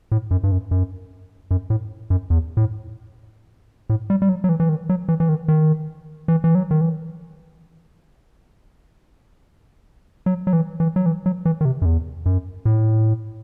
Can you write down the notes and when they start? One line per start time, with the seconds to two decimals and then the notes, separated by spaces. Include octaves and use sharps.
0.12 A2
0.31 F#2
0.44 G2
0.52 F#2
0.71 F#2
1.51 F#2
1.70 A2
2.10 F#2
2.30 E2
2.57 A2
3.90 A2
4.10 G3
4.22 G3
4.29 F#3
4.44 F#3
4.49 E3
4.60 E3
4.69 D#3
4.89 F#3
5.08 E3
5.20 E3
5.29 D#3
5.48 D#3
6.28 E3
6.44 E3
6.55 F#3
6.71 D#3
6.81 E3
10.26 F#3
10.47 F#3
10.53 E3
10.80 E3
10.96 F#3
11.06 E3
11.26 F#3
11.45 E3
11.61 D#3
11.65 C3
11.82 F#2
11.85 E2
12.26 F#2
12.65 A2